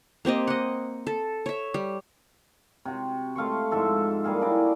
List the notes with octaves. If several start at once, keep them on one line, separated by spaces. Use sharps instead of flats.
A#3 C4 G4 D#5
D#5 F#5
A4
C#5 E5
G3
C3 F#4
A3 F5 C6 C#6
G#2 F3 A4 E5
G3 A#3 G#4 F5
D4 E4 F#4 D5